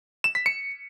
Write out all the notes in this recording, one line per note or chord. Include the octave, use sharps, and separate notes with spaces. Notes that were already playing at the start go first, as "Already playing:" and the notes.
E7
B6
C#7